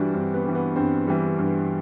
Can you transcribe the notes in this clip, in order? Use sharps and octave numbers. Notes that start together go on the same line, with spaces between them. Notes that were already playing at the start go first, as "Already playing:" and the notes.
Already playing: G2 E3 G3 D4 F#4
G2 C4
B3
E3 G3
B3
G2 C4
E3 G3
G2